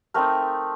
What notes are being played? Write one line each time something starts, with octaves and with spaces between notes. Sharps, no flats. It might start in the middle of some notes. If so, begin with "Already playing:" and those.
A3 C4 D#4 A#4